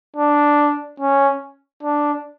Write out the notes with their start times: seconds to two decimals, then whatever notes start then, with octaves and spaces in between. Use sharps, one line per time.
0.17 D4
1.00 C#4
1.83 D4